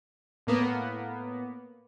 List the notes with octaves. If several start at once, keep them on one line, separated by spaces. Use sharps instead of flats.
A2 A#3 B3